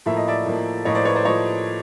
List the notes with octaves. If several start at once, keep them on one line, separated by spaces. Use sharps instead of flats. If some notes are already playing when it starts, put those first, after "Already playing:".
A2 F3 A#3 E5
D#5
D5 E5
A2 F3 A#3
A2 F3 A#3 C#5 D#5
C5 D5
B4 C#5
C5 D5
F3 A#3 C#5 D#5